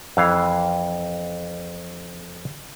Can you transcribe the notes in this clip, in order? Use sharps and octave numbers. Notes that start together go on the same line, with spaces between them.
F2 E3 F5